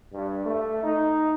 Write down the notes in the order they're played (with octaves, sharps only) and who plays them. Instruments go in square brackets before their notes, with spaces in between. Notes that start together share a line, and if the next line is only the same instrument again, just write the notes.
[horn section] G2
A3
D#4